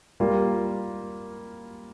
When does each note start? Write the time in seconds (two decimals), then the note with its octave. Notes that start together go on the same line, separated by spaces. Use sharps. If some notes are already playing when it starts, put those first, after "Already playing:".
0.20 G3 A#3 F4